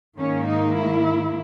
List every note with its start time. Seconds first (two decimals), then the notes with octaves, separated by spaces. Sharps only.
0.17 G#2 D#3 A#3 C#4
0.46 D#4
0.75 E4